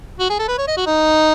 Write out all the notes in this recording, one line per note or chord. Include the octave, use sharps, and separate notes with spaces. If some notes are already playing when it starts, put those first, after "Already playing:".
F#4
G#4
A4
B4
C#5
D#5
F#4
D#4